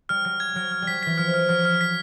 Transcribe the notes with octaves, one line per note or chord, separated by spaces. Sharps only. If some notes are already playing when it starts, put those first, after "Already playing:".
G3 F6
F#3 F6
G#6
F#3 F6
F6
G3
F#3 B6
E3 B6
F3 F6
F6
F#3 F6
F6
B6